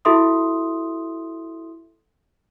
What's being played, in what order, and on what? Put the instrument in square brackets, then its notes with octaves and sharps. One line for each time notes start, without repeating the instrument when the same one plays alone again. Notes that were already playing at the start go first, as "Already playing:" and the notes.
[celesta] E4 F#4 A4 E5 C6 D#6